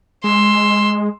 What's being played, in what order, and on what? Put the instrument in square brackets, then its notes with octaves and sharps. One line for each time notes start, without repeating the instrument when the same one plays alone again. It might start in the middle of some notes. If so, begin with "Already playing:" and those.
[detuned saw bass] G#3 [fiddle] C6 E6